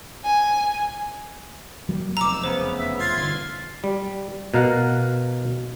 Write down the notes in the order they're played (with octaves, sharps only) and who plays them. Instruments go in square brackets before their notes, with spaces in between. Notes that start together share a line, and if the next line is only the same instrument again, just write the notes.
[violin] G#5
[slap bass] F#3 G3 A#3
[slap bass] F1 E2 [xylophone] A#5 D6 [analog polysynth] E6
[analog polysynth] C#3 B3 [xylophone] C5
[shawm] E5
[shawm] F4 [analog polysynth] C6 G#6 A6
[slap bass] G1 D#3
[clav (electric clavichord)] G3
B2 A#4 F5 F#5